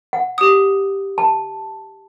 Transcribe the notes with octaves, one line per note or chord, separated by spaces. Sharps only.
F#5
G4 D#6
A5